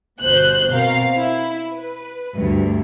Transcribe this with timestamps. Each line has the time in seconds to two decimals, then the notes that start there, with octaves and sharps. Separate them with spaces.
0.21 G1 B2 C5 F#6 G6
0.70 B2 C4 A#4 F5
1.17 E4
1.73 B4
2.36 D2 G2